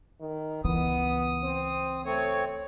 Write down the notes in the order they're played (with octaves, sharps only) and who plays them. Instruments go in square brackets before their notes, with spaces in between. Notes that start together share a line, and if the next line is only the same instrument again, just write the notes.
[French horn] D#3
[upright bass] C#2 E3 [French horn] B3 [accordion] D#6
[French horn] C4
[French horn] A3 [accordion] C4 C#5